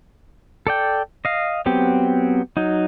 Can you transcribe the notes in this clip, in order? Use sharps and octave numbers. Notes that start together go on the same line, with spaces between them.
A4 D5 G5
D#5 F5
F#3 B3 C4 G4
F#3 D#4